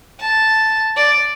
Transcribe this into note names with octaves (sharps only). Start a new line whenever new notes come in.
A5
D5